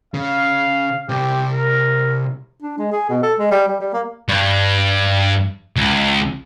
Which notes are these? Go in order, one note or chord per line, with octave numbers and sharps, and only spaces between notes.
C#3 F5
C2 C3 G4
A#4
D4
G#3
G#4
B2
A4
G#3
G3
G3
G3
A#3
G2
C#2